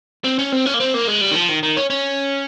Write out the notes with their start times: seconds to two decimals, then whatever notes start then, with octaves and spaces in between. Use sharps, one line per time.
0.25 C4
0.39 C#4
0.52 C4
0.66 C#4
0.74 A#3
0.80 C4
0.94 A#3
1.07 G#3
1.21 G3
1.31 D#3
1.35 F3
1.49 D#3
1.63 D#3
1.77 C#4
1.90 C#4